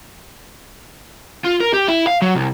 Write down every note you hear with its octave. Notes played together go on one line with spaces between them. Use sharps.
F4
A#4
G4
E4
F5
F#3
C2